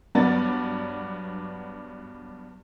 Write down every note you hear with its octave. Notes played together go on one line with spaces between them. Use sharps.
G2 F#3 B3 D4 A6